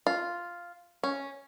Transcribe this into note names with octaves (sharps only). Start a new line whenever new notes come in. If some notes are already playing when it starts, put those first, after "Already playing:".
F4
C#4